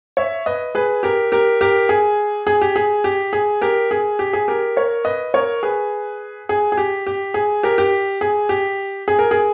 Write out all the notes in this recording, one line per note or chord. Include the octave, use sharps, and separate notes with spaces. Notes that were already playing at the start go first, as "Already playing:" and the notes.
C#5 E5
B4 D#5
G#4 B4
G4 A#4
G4 A#4
G4 A#4
G#4
G#4
G4
G#4
G4
G#4
G4 A#4
G#4
G4
G#4
G4 A#4
A#4 C#5
B4 D#5
A#4 C#5
G#4 B4
G#4
G#4
G4
G4
G#4
G4 A#4
G4
G#4
G4
G#4
A#4
G#4